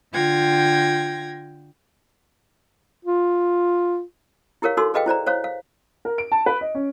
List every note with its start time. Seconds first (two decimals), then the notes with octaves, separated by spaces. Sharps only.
0.13 D3 F4 G5 G#6 A#6
3.05 F4
4.62 E4 G4 A#4 C#5 F5
4.77 D#4 F#4 A4 C6 E6
4.94 G#4 B4 D#5 F5 G5
5.06 E4 C5 D5 A#5
5.26 C5 C#5 F5
5.44 F5
6.05 A#4
6.18 D7
6.32 A5
6.46 B4
6.61 D#5
6.75 C#4